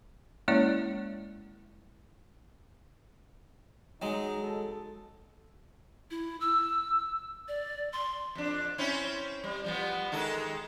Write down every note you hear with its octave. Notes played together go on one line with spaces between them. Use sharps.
G#3 A#3 C#4 E4 C#5 D5
F#3 G#3 D#4
A4
E4
E6
D5
C6
F2 D4
C4 C#4 E4
G3
F3 G3 B3
D#3 G#3 A4